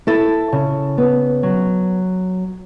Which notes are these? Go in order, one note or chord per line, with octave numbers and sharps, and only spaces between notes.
E4 A4
C#3
B3
F#3